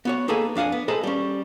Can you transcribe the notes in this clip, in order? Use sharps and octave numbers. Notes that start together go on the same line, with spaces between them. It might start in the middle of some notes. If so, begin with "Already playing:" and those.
B3 F#4 C#5
A#3 D#4 G#4 A4 B4 G#5
F2 D4 F5 F#5 G#5
B3
G#4 A4 B4 C5 D#5 A#5
G3 C#4